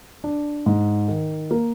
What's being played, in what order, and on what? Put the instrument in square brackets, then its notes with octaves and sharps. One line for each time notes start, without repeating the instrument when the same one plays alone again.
[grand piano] D4
G#2
D#3
A#3